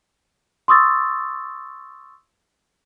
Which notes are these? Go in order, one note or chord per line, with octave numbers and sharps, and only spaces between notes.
C6 C#6 D#6 E6 A6